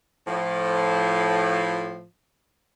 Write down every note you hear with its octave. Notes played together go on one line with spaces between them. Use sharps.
A2 F3